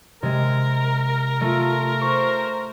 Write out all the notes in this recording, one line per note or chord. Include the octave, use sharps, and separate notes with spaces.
C3 G#3 A#4
A3 F4
C5 C#6 C#7